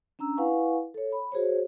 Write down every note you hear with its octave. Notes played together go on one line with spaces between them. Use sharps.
C#4 D4 A#5 E6
E4 B4 F5 F#5 G#5 C#6
A4 C#5
B5
F#4 G#4 C5 C#5